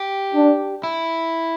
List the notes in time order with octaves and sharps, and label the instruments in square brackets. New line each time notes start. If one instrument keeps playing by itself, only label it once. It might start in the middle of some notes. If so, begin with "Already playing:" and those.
Already playing: [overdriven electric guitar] G4
[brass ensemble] D4
[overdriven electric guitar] E4